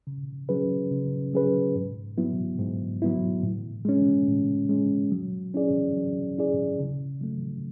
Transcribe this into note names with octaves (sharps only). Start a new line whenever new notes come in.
C#3
F#3 C#4 G#4 B4
C#3
F#3 C#4 G#4 B4
G#2
F#3 B3 E4
G#2
F#3 B3 E4
A2
G#3 C#4
A2
G#3 C#4
F#3
C#4 E4 G#4 D5
F#3
C#4 E4 G#4 D5
C#3
F#3 A3